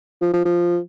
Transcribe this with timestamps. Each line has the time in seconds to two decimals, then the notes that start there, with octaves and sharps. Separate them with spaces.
0.21 F3
0.33 F3
0.45 F3